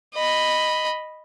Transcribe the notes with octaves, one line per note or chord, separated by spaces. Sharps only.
D#5 B5